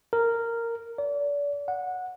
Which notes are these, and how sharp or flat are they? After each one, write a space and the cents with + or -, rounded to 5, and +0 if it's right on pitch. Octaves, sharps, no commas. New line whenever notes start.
A#4 -10
D5 -35
F#5 -15